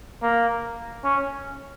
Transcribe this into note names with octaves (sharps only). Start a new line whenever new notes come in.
A#3
C#4